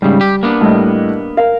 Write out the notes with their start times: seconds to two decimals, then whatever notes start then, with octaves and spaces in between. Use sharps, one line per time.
0.02 G#2 C#3 G3
0.21 G4
0.43 A#3 B3 D4
0.61 A2 G3 D#5
1.37 A#4 F5